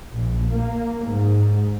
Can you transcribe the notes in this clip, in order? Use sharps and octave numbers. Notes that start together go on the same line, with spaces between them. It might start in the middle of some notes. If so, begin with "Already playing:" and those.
A#1
A#3
G#2